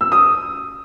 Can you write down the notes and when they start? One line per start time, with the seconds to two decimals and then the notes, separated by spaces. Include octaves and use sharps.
0.01 E6
0.12 D#6